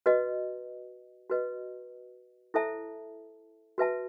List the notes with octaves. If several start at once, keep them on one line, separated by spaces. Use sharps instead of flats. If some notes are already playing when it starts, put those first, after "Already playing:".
F#4 B4 D#5
F#4 B4 D#5
E4 A4 C5 E5 A5
F#4 B4 E5 A5